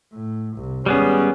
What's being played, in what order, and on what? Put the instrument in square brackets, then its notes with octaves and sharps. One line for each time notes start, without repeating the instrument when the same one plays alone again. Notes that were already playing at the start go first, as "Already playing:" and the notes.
[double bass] A2
C2
[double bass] G#1 C#4 [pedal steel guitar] G3 B3 G#4